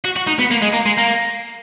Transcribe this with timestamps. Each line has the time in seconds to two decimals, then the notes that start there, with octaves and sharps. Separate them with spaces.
0.05 F#4
0.16 F#4
0.27 D#4
0.39 B3
0.51 A#3
0.62 G#3
0.74 A#3
0.86 G#3
0.98 A#3